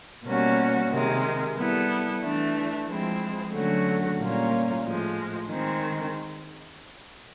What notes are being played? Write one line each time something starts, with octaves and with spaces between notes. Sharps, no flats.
B2 G3 A#3 C#4 F#4
C3 D#3 G#3
G3 B3 E4 A4
E3 A3 D4
F3 G#3 C4 E4
D3 F#3 A3 C#4 F#4
A#2 G3 A#3 C#4 F4
A2 F3 G#3
D#3 G#3 C4